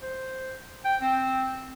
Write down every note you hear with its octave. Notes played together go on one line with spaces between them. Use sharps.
C5
G5
C4